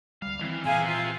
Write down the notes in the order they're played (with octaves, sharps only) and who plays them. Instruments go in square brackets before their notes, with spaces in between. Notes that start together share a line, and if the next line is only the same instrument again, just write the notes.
[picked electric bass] D2 G3 [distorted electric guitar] F5
[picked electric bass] D#3 C4 [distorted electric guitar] E3
[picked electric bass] A#2 E3 [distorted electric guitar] C4 E5 [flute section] G#4 F5 G#5
[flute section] F4